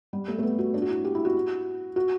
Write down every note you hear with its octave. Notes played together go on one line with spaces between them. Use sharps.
G3
A3
A3
B3
F#4
D4
F#4
E4
G4
E4
F#4
F#4